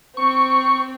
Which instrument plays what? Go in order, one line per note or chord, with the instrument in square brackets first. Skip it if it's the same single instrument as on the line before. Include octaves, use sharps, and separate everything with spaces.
[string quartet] C4 [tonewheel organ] C#6